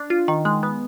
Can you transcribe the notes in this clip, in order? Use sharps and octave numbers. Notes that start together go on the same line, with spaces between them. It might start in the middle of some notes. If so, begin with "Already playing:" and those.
Already playing: D4
F4
D#3
G#3
B3